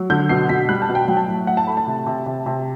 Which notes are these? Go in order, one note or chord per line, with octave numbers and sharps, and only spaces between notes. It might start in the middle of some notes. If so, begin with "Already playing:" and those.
Already playing: F#3
D3 G6
B2 C7
B2 B6
G3 F#6
A5
B2
G5
F#3 G5
A5
A2 G5
A2 F#5
A5
A3 B5
A5
C3
C3
C3
C3